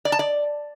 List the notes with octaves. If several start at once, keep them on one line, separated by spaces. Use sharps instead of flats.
D5
A5
D5